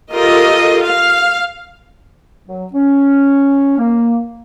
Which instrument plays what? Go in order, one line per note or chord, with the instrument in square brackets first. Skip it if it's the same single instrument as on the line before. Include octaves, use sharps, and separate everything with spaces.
[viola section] F4 G4 A4 A#4 D#5
F5
[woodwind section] F#3
C#4
A#3